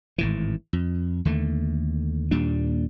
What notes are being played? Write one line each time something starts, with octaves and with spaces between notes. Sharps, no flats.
G#1 A2 E3
F2
D#2 D3 A3
D#2 A#2 G3 D4